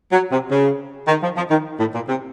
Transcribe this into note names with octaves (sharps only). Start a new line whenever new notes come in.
F#3
C3
C#3
D#3
F3
F3
D#3
A2
A#2
C3